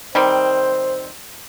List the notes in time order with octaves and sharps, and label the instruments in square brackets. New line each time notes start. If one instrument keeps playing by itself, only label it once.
[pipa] D#3 G3 C4 [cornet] C5